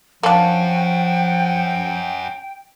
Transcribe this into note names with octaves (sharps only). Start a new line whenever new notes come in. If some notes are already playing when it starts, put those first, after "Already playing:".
F3 A#3 C#4 D4 F#4 G5